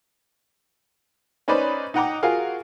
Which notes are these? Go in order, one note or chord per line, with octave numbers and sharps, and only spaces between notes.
C#4 D#4 B4 C5 D5
D#4 D#5 F#5 G5 A#5 D6
F4 F#4 G#4 A#4 F5